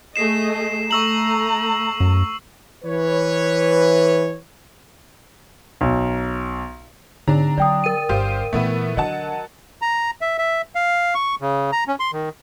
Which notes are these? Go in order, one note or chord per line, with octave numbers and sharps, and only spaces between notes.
A3 G#4 D#5 C7 E7
A3 A#5 C#6 E6 F#7
F#2
E3 B4 C#5
B1
G#2 D3 D4 D#4 A#5
F#3 D5 G5 D#6
A#4 D#7
G1 G4 C5 F5
A#2 E3 A3 B3 E4
D3 F#3 D#5 F#5 A5
A#5
E5
E5
F5
C#6
C#3
A#5
C#4
C6
D#3